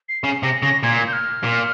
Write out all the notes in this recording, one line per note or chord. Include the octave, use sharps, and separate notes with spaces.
C7
C#3 C7
C3 A#6
C#3 A#6
A#2 G#6
G6
F6
A#2